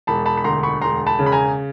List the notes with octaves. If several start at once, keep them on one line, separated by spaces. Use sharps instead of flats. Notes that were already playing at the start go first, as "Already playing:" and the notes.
E1 A5 B5
A5 B5
B5
D2 A#5 C6
B5 C#6
E1 A#5 C6
A5 B5
C#3
B5
G#5 A#5